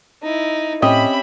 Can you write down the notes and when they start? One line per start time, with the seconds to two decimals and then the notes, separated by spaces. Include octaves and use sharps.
0.23 D#4 E4
0.82 A2 C4 C#4 G4 D#5 E5 B5